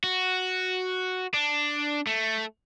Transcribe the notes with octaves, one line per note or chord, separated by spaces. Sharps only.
F#4
D4
A3